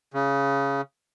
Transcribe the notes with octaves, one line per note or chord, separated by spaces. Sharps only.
C#3